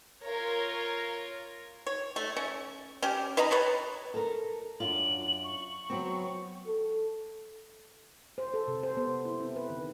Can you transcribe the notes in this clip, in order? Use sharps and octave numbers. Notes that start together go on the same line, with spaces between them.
F4 A#4 C#5
C#5
A3
C#4
C#4 G4
B4 D#5 A#5 B5
B4 C#5 A5
A4 A#4
F#2 D4 F4 F#7
C#6
F#3 B3 C4
A4
C5
A4
C3
C5
B3
E4
C4
B4
D#3